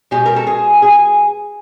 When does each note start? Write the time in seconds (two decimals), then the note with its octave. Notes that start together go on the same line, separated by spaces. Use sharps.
0.11 B2 G#3 G4
0.26 A#4
0.36 A4
0.47 G#4
0.82 G#4